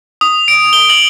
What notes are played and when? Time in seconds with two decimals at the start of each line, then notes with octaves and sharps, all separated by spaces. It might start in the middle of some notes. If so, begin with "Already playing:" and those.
0.21 D#6
0.48 D7
0.73 G7
0.90 F#7